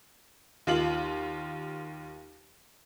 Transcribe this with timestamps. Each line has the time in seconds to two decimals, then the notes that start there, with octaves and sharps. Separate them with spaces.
0.67 D#2 F4 F#7